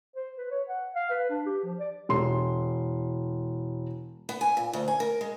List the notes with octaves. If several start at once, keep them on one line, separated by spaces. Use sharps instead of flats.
C5
B4
C#5
F#5
F5
B4
D4
G4
F3
D5
E1 C6
B3
G#5
A#2
D2
G#5
A#4
G#3